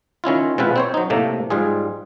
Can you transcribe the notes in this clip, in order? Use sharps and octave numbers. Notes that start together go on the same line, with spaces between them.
D#3 C#4 E4 F4
B2 G#3 C4 E4 F4 B4
C4 C5 C#5
F#3 D#4
A2 C3 A3 A#3
G#2 G3 F4 G#4